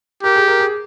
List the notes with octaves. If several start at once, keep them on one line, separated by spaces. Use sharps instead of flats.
G4 A#4
G#4
A#4
G#4